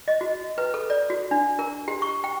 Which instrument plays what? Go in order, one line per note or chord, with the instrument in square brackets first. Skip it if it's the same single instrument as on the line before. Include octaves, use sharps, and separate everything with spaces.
[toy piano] D#5
F#4
B4
A4
D5
F#4
D4
A#4
G4
C#6
G5